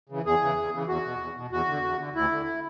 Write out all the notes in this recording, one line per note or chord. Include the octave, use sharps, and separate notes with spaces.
C#3 E3
E2 G#4
C#3 E3
E2
C#3 E3
E2 F#4
B2
E2
B2
E2 F#4
D3
E2
D3
D2 E4
D3